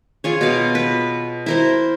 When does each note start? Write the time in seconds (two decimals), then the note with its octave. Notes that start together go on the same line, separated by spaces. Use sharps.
0.24 F4 G#4 C#5
0.41 B2 F5
0.75 B4
1.46 E4 A#4 C5